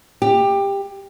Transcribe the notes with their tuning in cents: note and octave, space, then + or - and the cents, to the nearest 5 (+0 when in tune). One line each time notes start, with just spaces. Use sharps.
G4 +15